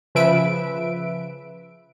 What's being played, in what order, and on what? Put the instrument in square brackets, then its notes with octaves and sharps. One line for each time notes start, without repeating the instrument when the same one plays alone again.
[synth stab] C#3 F3 B4 E5 D7